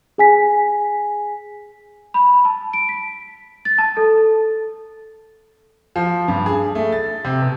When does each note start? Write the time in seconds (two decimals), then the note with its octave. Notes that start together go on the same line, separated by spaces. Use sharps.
0.18 G#4 G#5 B6
2.14 B5
2.45 A5
2.73 D7
2.89 B6
3.65 A6
3.78 A5
3.97 A4
5.96 F3
6.28 G2
6.46 G#4
6.75 A3
6.92 A6
7.24 C3
7.42 B2